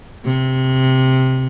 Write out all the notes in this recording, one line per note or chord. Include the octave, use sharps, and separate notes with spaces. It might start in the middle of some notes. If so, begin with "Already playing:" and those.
C3